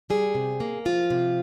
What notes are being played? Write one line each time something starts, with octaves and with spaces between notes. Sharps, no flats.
G3 G#4
C3
A#3
F3 F4
C3